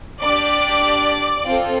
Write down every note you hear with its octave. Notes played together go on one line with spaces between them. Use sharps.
D4 G4 D5 D6
C4 F4 A4